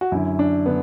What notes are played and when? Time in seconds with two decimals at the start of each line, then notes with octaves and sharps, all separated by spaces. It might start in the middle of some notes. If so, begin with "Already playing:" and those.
0.01 F#4
0.12 F#2 D3 E4
0.39 D4
0.66 D3 B3